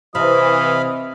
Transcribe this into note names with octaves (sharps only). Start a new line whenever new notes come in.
C3 E3 D#5 F5 B5